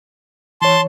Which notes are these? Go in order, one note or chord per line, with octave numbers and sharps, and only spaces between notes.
E3 C#5 A5 C6